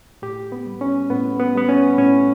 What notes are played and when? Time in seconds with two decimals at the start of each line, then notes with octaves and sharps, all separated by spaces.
0.22 A2 G4
0.52 B3
0.66 G3
0.81 C#4
1.10 A2 B3
1.40 B3
1.55 G3 B3
1.69 C#4
1.98 A2 C#4